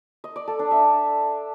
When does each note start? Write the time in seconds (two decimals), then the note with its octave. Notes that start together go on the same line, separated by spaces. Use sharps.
0.24 D#5
0.36 D5
0.47 A4
0.59 D4
0.71 E5